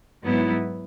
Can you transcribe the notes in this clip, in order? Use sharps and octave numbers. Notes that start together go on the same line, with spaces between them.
G#2 F#3 B3 E4